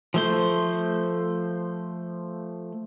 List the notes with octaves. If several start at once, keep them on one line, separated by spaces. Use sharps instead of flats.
F3 A3 C5